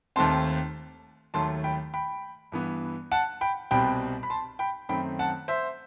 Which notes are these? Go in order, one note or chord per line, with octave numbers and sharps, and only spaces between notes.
D#2 D#3 A3 C4 A5 C6
D#2 D#3 F#3 A3 A5 C6
G5 B5
G5 B5
G2 E3 B3
F#5 A5
G5 B5
C2 B2 G3 C4 G5 B5
B5
A5 C6
G5 B5
F#2 D#3 A3 C4 G5 B5
F#5 A5
C5 E5